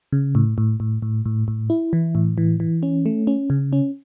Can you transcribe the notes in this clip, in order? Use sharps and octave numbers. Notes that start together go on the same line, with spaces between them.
C#3
A2
A2
A2
A2
A2
A2
E4
E3
A2
E3
E3
C#4
A3
C#4
C#3
C#4